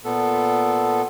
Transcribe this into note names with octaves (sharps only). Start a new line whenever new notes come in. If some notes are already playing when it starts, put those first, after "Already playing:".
A#2 B3 A4